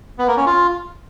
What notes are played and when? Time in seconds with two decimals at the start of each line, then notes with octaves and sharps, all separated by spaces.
0.19 B3
0.28 A#3
0.37 C#4
0.46 F4